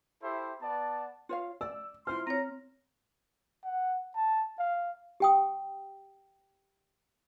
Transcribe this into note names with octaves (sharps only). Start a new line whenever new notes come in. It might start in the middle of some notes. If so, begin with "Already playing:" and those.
E4 G4 A4 C5 E5
B3 D5 F#5 A5
F4 C#5 F5
D5 E6
E4 F4 C5 C6 F6
C4 C#5 A#5
F#5
A5
F5
G4 G5 D#6